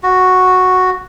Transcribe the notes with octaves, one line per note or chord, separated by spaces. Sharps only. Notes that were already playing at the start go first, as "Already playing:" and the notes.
F#4